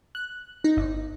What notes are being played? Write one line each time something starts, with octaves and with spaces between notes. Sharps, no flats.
F#6
D#4
G1